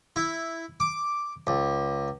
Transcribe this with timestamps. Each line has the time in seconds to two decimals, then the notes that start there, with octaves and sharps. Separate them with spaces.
0.16 E4
0.80 D6
1.47 C#2